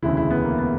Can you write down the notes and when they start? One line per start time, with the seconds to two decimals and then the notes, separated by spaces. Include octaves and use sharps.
0.02 E1 D2 C#3 E4
0.17 E4
0.30 B3
0.45 A#3
0.58 B3